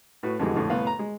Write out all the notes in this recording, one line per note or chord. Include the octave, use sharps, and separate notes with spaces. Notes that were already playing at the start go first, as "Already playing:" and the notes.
A2 F#4 B4
F2 B2 D3 E3 G3 G#3
F2 A2 D3
C2 A2 B3 F5
A#5
G#3